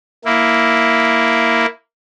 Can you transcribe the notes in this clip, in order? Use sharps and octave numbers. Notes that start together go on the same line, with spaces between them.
A#3 E4